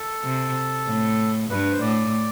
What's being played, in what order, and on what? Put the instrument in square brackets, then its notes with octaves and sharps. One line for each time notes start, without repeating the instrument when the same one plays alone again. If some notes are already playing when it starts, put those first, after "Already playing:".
Already playing: [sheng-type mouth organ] A4
[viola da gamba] C3
A2
[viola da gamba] G2 [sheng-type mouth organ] B4
[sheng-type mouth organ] C5
[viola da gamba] A2 [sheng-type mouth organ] D5